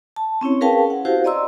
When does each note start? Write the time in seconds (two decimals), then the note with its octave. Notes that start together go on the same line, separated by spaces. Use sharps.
0.16 A5
0.41 C4 C#4 E4 C#5
0.61 G#4 A#4 B4 F5 G5 A5
0.90 F#5
1.05 E4 F#4 G4 C5 F5
1.24 D5 D#5 A#5 C6 E6